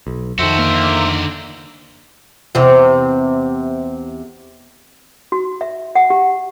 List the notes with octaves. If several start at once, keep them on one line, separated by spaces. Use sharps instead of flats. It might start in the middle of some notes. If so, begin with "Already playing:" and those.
B1
F2 D#3 F#4 A4 C5 E5
D3 A#3 A#4
E2 C3
F#4
E5
F#5
G4